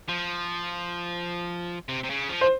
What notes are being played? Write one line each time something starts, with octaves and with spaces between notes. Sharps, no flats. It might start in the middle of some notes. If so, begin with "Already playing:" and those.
F3
C3
C3
C#3
F3
C5